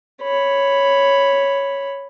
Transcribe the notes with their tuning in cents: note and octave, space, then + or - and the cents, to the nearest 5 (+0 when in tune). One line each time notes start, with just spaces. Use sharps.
C#5 +0 B5 +0